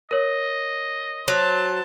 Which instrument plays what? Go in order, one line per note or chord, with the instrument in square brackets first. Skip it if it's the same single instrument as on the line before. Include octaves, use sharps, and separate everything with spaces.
[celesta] A#4 C#5 [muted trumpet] D#5
[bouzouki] F#3 [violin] C5 A5